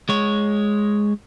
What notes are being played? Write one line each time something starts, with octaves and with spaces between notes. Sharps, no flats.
G#3 C#5